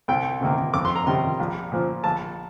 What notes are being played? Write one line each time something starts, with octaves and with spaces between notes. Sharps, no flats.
C2 G5
C3 D#3 A#3
F2 D6
C6
A#5
C3 D#3 G3 C6
A#1
A#2 F3
A#1 A5